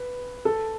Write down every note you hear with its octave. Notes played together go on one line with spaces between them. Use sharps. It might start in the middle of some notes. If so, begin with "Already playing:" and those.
Already playing: B4
A4